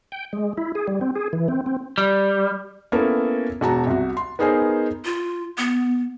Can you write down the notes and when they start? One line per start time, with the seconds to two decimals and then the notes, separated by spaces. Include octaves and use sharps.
0.12 G5
0.33 G#3
0.57 E4
0.75 G#4
0.87 G3
1.01 C4
1.15 G#4
1.33 E3
1.48 C4
1.66 C4
1.98 G3
2.92 A#3 B3 C#4 E4 A4 A5
3.61 E1 F#4 A5 A#5
3.87 C2 F#4
4.17 C6
4.39 B3 D#4 G#4 A#4 C5 G#5
5.05 F4
5.58 B3